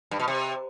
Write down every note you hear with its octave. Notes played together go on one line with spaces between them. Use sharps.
G2
B2
C3